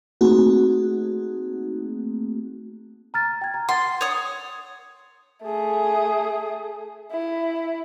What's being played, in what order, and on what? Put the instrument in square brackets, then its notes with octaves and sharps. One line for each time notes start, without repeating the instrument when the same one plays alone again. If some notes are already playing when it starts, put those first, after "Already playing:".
[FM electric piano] A3 A#3 C4 D#4 F#4 G#4
[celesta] A#5 F6 A6
G5 G#6
A#5
[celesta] F#5 A6 [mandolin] C6
[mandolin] C#5 D#6
[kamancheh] A3 G#4
E4